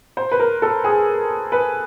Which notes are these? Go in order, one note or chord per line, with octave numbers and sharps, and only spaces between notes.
C5
B4
A#4
A4
G#4
B4